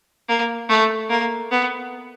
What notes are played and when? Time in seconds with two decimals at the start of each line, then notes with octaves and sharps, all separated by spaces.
0.29 A#3
0.69 A3
1.10 A#3
1.51 B3